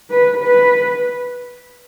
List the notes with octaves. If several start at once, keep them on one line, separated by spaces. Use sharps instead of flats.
B4
B4